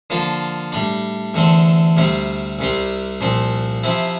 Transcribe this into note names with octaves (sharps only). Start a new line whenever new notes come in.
D3 F3 A#3 F4
A2 G3 D4
E2 D3 A3 C4
D2 C3 G3 C4
C2 C3 G3 C4
C2 A#2 F3 C4
C3 F3 C4 E4